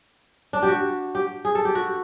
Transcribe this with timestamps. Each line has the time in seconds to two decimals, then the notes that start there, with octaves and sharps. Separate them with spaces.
0.53 D4
0.63 G4
0.68 F#4
1.15 G4
1.45 G#4
1.55 A4
1.65 G4
1.75 F#4